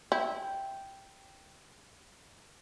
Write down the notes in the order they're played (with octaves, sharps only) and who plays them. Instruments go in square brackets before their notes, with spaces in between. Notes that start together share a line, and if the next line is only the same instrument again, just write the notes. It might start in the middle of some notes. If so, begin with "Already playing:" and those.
[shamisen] E4 [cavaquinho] G5